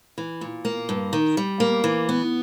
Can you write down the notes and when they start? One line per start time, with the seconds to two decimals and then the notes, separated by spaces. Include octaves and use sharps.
0.18 E3
0.41 A#2
0.65 A#3
0.89 G2
1.13 D#3
1.37 G3
1.60 A#3
1.84 E3
2.09 B3